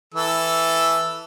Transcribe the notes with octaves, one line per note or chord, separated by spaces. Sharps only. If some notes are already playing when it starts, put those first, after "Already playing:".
E3 A4 E6